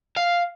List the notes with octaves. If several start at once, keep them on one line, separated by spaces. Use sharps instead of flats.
F5